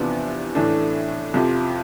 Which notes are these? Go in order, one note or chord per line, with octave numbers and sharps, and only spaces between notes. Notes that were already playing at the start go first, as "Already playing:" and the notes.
Already playing: E2 C3 F3 B3 D4
A2 E3 A3 D4
F2 C3 F3